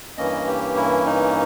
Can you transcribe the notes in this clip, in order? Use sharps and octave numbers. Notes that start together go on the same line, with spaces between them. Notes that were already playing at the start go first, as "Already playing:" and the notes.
G2 E3 A#3 C#4 D#5
G4
E4
D#4